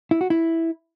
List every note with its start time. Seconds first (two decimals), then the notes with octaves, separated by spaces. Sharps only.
0.11 E4
0.21 F#4
0.30 E4